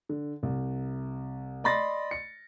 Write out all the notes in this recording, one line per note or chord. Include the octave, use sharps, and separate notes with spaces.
D3
C2
D5 D#5 B5 C6 A6 A#6
C#7